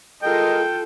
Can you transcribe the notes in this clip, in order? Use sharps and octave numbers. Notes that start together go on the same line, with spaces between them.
G#3 F4 A4 A#4 D#5 G5